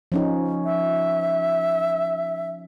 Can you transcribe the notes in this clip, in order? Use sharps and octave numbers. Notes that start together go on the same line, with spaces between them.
F3 C#4 D#4
E5